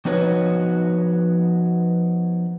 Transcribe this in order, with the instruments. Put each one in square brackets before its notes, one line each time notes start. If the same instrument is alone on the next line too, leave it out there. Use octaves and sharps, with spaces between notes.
[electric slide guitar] F3 B3 D#4 F#4 B4 C#5